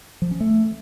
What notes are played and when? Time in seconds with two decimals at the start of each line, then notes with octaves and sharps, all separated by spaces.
0.22 F3
0.31 C#4
0.41 A3